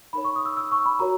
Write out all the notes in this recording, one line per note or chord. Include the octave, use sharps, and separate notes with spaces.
D#4 A#4 C#5 B5
C#6
D#6
E6
E6
C#6
B5
F#4 A#4 C#5 A#5